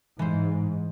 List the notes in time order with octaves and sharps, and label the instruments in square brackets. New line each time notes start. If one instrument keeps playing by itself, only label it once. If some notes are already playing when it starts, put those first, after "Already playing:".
[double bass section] G#2 [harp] E3 C5